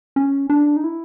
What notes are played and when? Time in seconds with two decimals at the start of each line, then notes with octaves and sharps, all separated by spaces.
0.16 C#4
0.50 D4
0.77 D#4
0.84 E4